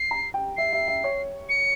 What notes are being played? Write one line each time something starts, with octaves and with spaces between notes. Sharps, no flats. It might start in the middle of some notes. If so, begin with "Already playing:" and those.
Already playing: C7
A#5
G5
E5 C7
E5
E5
C#5
C#7